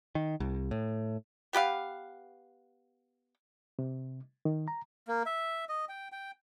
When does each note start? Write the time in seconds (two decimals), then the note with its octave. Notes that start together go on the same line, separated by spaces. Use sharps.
0.15 D#3
0.40 C2
0.71 A2
1.53 B3 G4 B4 F5
3.79 C3
4.45 D#3
4.68 A#5
5.08 A#3
5.26 E5
5.69 D#5
5.89 G5
6.12 G5